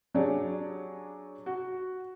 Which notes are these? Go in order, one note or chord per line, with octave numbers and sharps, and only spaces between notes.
F#3 D4 G4 G#4 C#5 D5
F#4